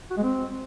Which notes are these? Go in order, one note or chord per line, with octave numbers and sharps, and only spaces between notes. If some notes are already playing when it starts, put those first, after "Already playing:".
F#4
G#3
C4